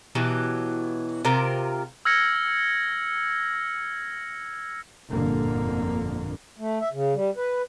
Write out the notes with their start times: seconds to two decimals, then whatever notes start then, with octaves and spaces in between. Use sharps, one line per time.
0.15 B2 E3 F#3 G4
1.25 C3 F4 A#4 G5
2.05 E6 F6 G#6 A#6 C#7
5.10 G1 F2 A#2 D3 A#3
6.59 A3
6.81 E5
6.93 C#3
7.14 G3
7.36 B4